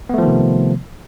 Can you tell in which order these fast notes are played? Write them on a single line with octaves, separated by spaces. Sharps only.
B3 A3 F3 D#3 C3